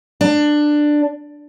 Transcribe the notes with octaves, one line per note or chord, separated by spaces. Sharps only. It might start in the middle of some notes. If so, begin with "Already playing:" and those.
D4